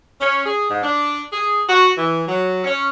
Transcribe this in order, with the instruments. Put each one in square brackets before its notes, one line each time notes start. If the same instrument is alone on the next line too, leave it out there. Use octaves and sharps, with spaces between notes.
[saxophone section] C#4
G#4
G#2
D4
G#4
F#4
E3
F#3
C#4